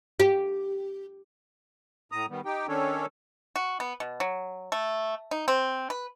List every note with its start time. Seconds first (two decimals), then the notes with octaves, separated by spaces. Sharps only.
0.20 G4
2.12 A2 A#5 D#6
2.30 D#3 G3 B3
2.45 D#4 G4 G5
2.68 D#3 C#4 D4 A4 C#5
3.56 F#4
3.80 B3
4.00 B2
4.20 F#3
4.72 A3
5.31 D#4
5.48 C4
5.90 B4